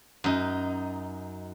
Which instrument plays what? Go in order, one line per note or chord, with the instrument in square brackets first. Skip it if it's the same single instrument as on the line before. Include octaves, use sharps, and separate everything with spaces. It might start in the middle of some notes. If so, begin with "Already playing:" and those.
[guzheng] F#2 D#4